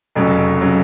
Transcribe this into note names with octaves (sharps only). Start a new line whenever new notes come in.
F1 F2 C#3 F#3
C#3 F#3